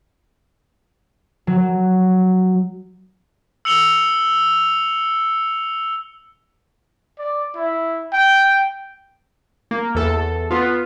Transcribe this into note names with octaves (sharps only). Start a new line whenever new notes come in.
F#3
E6 C#7 F7 G7
D5
E4
G5
A#3
E2 A4
B3 F4